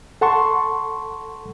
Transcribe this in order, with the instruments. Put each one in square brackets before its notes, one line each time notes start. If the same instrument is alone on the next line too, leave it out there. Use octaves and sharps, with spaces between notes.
[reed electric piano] A4 F#5 A5 C6 C#6